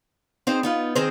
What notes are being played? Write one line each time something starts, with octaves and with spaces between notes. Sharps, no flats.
C4 D#4 G#4 C5
B3 D#4 F4
D#3 C4 D#4 G#4 C5